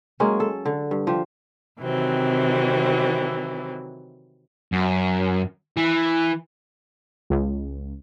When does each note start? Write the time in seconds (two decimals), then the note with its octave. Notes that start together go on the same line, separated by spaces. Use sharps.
0.20 F#3 G#3 A#3 C#4
0.40 A4
0.66 D3
0.91 G2
1.07 F3 G4
1.79 C3 D#3 E3 F#3 C4
4.72 F#2
5.77 E3
7.30 C#2